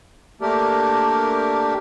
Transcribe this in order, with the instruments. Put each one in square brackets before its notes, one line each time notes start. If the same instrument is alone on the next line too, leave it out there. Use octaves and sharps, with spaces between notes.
[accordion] A3 A#3 D4 G4 A#4